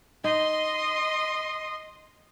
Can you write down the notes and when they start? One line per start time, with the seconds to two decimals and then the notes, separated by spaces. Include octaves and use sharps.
0.24 D#4 D#5 C6